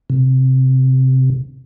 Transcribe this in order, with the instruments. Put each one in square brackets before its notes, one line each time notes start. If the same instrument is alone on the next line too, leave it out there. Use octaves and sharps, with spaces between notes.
[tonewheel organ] C3